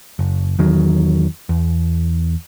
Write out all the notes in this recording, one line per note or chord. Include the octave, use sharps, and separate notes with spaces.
F#1
E2 D#3 F#3
E2